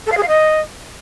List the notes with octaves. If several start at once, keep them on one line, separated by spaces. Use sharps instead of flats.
A4
F5
G#4
F5
D#5